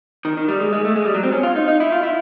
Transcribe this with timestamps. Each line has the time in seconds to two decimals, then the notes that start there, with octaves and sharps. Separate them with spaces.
0.25 D#3
0.37 D#3
0.48 G3
0.60 G#3
0.73 G#3
0.85 A3
0.96 G#3
1.05 G3
1.14 F#3
1.23 C4
1.32 C#4
1.43 F4
1.56 D#4
1.68 D#4
1.80 E4
1.92 F4
2.03 E4